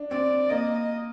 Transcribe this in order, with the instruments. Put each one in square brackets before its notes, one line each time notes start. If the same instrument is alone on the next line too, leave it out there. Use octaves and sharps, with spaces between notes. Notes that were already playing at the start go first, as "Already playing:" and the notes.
Already playing: [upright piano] D4
[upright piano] C4 [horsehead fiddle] D5
[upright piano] A#3 [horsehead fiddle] D#5